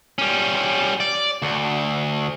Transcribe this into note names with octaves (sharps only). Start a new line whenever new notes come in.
G3 C#4
D5
D2